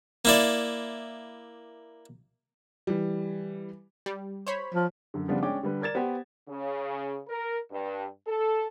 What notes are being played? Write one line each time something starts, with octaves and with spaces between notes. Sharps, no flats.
A#3 E4 D5
E3 G3
G3
C5 C#5 B5
F3
F#2 D3
C#3 F3 G3 B3 D4 F4
G#3 C#4 D4 G5 D6
D3 G3 B4
A#4 D5 G#6 A6 E7
B3 G4 C5
C#3
A#4
G2
A4